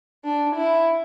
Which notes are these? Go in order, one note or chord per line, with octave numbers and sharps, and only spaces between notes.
D4
E4